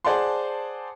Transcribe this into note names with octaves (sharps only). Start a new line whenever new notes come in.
G#4 C5 D5 F#5 A5 C6